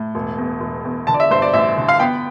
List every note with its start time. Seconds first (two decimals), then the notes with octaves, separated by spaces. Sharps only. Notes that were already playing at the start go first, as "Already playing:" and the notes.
Already playing: A2
0.15 E1
0.38 E2
0.61 E1
0.85 E2
1.07 D3 A5
1.14 D5
1.20 E5
1.30 G2 C5
1.42 D5
1.54 A1 E5
1.78 D3
1.89 F5
2.00 B3 G5